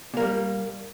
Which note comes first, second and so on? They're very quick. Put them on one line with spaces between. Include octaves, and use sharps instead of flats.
A#2 A#3 G3